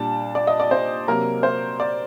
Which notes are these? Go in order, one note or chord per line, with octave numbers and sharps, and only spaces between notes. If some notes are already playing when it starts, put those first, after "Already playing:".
Already playing: A#2 G3 D4 A5
D5
D#5
D5
C5
C3 F#3 A#3 A#4
C5
D5